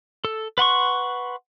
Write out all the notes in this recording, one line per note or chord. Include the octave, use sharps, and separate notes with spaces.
A4
B4 F#5 C6 C#6